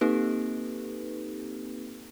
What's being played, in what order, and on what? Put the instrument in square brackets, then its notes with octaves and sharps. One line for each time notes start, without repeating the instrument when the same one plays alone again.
[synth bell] A#3 C4 D#4 G4 A4 B4